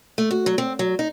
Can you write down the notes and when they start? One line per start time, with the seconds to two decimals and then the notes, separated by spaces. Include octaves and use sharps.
0.18 A3
0.31 F#4
0.46 F#3
0.58 C4
0.79 F#3
0.99 D#4